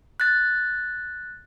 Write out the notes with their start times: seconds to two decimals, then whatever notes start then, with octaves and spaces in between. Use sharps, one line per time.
0.20 F#6 A6